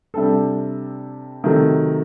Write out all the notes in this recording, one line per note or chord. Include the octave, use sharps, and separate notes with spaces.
C3 G3 D4 A4
C3 D#3 F#3 A3